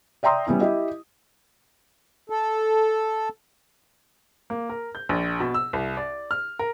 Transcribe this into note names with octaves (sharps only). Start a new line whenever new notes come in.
D5 E5 G5 A#5 C6 D#6
G3 B3 C#4 E4
E4 G4 D#5
A4
A#3
A#4
G6
A#1
B2
E6
C2
D5
F6
A#4